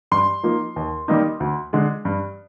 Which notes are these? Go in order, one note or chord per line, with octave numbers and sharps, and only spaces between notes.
G2 C6
F3 A#3 D#4
D#2
D#3 G3 A#3 D#4
D2
D3 G#3
G2